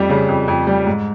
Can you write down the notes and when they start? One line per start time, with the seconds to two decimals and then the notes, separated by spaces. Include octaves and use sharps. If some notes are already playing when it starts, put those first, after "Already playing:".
Already playing: F2 G3
0.10 C#3
0.29 F2
0.48 F2
0.67 G3
0.86 G#2